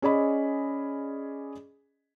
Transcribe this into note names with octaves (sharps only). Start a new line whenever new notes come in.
C#4 G#4 D5 D#5 B5